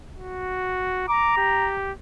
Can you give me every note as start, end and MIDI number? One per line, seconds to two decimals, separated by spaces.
0.18 1.07 66
1.08 1.72 82
1.08 1.34 86
1.37 1.92 67